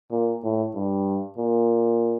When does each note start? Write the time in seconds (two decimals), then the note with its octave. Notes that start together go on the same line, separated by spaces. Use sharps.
0.11 A#2
0.43 A2
0.75 G2
1.37 A#2